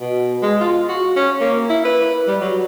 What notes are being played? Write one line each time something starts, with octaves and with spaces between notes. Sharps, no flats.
B2
G#3
F4
F#4
C#4
A#3
E4
B4
G3
F#3